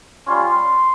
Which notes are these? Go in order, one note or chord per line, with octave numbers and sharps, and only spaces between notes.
G3 C#4 F4 C6